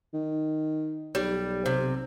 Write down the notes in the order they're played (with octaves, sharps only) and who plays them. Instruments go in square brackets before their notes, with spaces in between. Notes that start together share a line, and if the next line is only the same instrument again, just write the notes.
[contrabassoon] D#3
[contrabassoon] B1 [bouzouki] G3
[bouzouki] C3